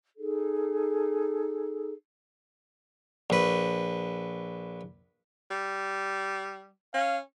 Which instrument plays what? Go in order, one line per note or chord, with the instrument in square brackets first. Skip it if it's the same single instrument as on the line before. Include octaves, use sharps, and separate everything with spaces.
[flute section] D#4 G#4 A4
[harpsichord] A#1 B4
[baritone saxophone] G3
[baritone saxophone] C#4 [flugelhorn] F5